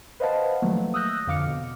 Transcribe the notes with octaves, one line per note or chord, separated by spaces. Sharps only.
B4 C5 D#5 F5 F#5 A5
D#3 F3 F#3 A3 A#3
D#6 E6 F#6 G6 A#6
F2 D3 F5 D6 F6 C#7
B2